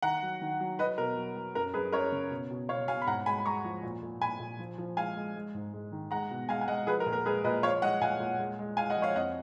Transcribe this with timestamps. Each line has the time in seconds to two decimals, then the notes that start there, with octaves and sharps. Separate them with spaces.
0.02 D#3 F#5 A#5
0.23 F#3
0.41 D#3
0.60 F#3
0.79 F#3 B4 D#5
0.98 B2 A#4
1.16 F#3
1.36 F#3
1.55 F#2 A#4
1.74 F#2 G#4 B4
1.92 F#2 A#4 C#5
2.12 C#3
2.31 B2
2.51 B2
2.69 B2 C#5 F5
2.88 B2 F5 G#5
3.02 B5
3.07 G#2 F#5 A#5
3.26 G#3 G#5 B5
3.38 B5
3.46 G#3 A#5 C#6
3.64 F3
3.83 A#2
4.03 A#2
4.22 A#2 G#5 B5
4.40 A#2
4.59 F3
4.78 F3
4.97 G#3 F5 G#5
5.16 G#3
5.36 G#3
5.55 G#2
5.73 G#3
5.92 D#3
6.11 G#3 F#5 A#5
6.31 B2
6.49 G#3 F5 G#5
6.61 G#5
6.68 G#3 D#5 F#5
6.87 F3 G#4 B4
7.00 A#4
7.06 A#2
7.13 A#4
7.25 G#3 G#4 B4
7.44 A#2 B4 D#5
7.63 F3 C#5 F5
7.82 G#3 D#5 F#5
8.01 A#2 F5 G#5
8.20 A#2
8.39 G#3
8.59 G#3
8.77 G#3 F5 G#5
8.90 D#5 F#5
8.97 F3
9.02 C#5 F5
9.15 F2 D#5 F#5